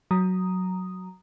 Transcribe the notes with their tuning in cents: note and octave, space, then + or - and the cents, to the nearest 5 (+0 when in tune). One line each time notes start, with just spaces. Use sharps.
F#3 +0 A#5 -5 D#6 +0